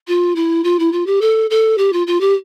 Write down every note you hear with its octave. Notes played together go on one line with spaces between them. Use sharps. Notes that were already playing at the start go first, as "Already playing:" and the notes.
F4
E4
F4
E4
F4
G4
A4
A4
G4
F4
F4
G4